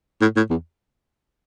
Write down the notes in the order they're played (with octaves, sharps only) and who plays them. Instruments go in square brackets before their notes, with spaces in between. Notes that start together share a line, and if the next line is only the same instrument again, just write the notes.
[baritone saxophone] A2
A2
E2